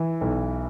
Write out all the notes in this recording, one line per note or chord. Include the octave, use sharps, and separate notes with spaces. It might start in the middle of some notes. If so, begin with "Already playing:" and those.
Already playing: E3
B1